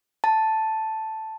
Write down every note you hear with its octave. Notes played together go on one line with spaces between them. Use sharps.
A5